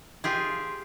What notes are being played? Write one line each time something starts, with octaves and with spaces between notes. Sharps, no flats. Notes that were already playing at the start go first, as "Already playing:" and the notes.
F4 G4 G#4